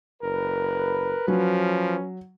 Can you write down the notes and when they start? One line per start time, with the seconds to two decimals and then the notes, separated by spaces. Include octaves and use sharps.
0.23 F#1 A#4 B4
1.28 F3 F#3 C#4